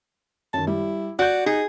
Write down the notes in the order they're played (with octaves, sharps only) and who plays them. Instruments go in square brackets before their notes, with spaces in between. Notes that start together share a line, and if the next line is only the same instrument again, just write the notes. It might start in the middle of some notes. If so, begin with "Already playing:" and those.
[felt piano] F#2 D#3 [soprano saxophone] A5
[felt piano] G3 [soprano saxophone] E4
[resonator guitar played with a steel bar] F#4 [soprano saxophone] D5 [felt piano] F#6 G6
[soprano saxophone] D#4 [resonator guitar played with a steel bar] G#4